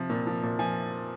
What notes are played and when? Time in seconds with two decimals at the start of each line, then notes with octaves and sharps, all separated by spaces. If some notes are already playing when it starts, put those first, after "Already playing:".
Already playing: C3 F3
0.10 A#2
0.27 F3
0.43 A#2
0.59 F3 G#5